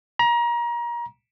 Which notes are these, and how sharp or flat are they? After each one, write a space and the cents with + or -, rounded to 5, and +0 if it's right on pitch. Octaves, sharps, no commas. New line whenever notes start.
A#5 +30